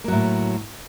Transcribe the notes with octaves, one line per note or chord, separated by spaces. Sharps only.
A2 F#3 A#3